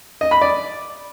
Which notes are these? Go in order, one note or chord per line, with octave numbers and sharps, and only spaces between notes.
D#5
B5
D5